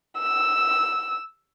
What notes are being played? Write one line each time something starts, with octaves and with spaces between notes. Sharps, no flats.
E6